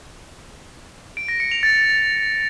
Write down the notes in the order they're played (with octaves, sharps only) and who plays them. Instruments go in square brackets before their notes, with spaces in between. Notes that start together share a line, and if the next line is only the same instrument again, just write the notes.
[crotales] D7
A#6
C#7
F7
A6